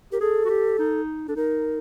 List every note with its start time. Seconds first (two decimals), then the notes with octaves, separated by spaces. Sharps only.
0.12 G4 A#4
0.20 G#4 A4
0.45 F#4
0.50 G4
0.79 D#4
1.28 D4 A4
1.36 D#4 A#4